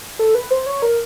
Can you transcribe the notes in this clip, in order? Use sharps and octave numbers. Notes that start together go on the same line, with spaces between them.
A4
B4
C5
C#5
A#4